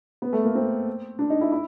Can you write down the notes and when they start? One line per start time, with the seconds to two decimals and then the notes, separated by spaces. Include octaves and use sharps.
0.22 B3
0.33 A3
0.45 A#3
0.55 C4
1.19 D4
1.30 D#4
1.41 E4
1.52 E4